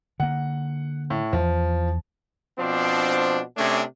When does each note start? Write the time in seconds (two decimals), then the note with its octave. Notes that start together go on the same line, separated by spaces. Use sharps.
0.20 D3 A#3 F#5
1.10 A2
1.33 E2 F3
2.59 B2 F3 C4 D4
3.56 C3 A3 C#4 D4 G#4